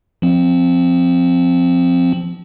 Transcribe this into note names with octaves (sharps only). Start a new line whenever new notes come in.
F3 C4